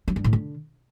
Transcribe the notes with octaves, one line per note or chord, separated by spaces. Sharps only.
F#3
G2
A2
D3